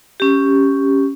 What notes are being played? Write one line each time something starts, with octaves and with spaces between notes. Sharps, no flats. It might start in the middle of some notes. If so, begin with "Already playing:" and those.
C#4 G4